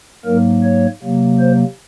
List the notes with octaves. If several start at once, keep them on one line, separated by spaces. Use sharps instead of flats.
G#2 F#3 A#3 A#4
C#5
C3 F#3 A#3
C5